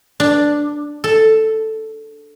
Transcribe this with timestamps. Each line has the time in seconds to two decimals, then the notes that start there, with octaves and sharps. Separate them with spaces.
0.20 D4
1.04 A4